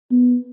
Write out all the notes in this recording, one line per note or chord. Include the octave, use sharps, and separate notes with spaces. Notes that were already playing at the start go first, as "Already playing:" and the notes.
B3